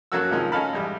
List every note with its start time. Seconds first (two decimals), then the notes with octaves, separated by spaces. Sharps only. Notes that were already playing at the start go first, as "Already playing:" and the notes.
0.12 F#2 F#3 A#3 F#4 A4 E6
0.31 C3 D#3 F3 G#3 C#4 G#4
0.52 C#4 D#4 A4 F5 A5 B5
0.73 A1 G3 G#3